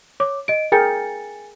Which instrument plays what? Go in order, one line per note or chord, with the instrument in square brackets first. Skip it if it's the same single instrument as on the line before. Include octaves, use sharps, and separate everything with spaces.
[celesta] C#5 D6
D#5 D7
[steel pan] G#4 A#4 G5 [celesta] G#5 A6 C#7